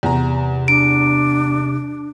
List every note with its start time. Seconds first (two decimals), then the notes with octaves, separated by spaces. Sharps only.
0.03 E2 C3 A#5
0.68 D4 D7